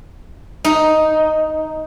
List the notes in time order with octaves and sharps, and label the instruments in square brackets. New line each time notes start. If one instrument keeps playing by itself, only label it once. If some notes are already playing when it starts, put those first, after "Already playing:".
[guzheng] D#4